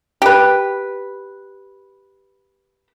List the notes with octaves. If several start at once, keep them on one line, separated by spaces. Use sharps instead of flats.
G4 B4